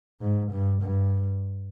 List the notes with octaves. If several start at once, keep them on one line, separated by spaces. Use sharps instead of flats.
G#2
G2
G2